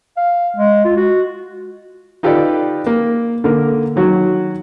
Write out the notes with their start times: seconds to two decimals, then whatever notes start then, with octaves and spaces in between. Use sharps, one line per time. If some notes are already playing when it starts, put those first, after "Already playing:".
0.17 F5
0.57 G#3
0.85 F4
0.97 F#4
2.23 D#4 F4 G4 A4 B4 D5
2.87 A#3
3.44 D3 A#3 A#4
3.96 D#3 F#3 F#4